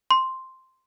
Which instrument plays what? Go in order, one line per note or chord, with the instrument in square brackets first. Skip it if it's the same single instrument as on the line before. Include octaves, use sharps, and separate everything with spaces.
[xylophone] C6